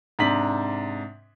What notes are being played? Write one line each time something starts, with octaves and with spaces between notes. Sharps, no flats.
G#2 C3 D4 B6 F#7